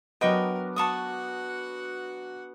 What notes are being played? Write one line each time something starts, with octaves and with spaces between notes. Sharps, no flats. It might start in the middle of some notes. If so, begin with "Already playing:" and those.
F#3 B3 D4 A#4 D#5 G5 C#6 D7
F#4 F#5 A5 C#6 D#6